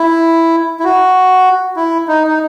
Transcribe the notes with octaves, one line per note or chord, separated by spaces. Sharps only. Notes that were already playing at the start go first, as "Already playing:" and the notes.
Already playing: E4
E4
F#4
E4
D#4
D#4